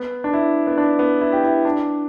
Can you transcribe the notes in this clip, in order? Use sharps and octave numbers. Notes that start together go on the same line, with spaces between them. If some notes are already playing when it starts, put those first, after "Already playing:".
Already playing: B3
D4
E4
B3
D4
B3
E4
G4
E4
D4